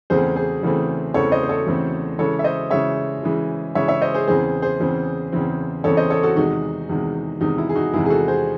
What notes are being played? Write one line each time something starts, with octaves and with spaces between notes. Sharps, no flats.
E2 C#3 E3 A3 C4 G#4 C5
G#4 C5
E2 C#3 E3 A3 C4
E2 C#3 E3 A3 C4 A4 C#5
C5 D#5
C5
A4 C#5
E2 C#3 E3 A3 C4
C#3 E3 G#3 A4 C#5
E5
C5 D#5
C#3 E3 G#3 C#5 E5
C#3 E3 G#3
C#3 E3 G#3 C#5 E5
C#5 E5
C5 D#5
G#4 C5
E2 C#3 E3 C4 G#4 C5
G#4 C5
E2 C#3 E3 C4
E2 C#3 E3 C4
E2 C#3 E3 C4 A4 C#5
C5 D#5
A4 C#5
F#4 A4
E2 C3 D#3 G#3 D#4 F#4
E2 C3 D#3 G#3
E2 C3 D#3 G#3 D#4
E4
G#4
D#4 F#4
E2 C3 D#3 G#3 E4 G#4
G#4
F#4 A4
G#4 C5